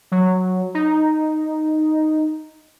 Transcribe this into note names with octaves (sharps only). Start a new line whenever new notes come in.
F#3
D#4